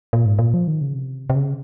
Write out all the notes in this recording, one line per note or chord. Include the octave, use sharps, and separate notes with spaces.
A#2
G#2
A#2
F3
D#3
C#3
C3
C3
C#3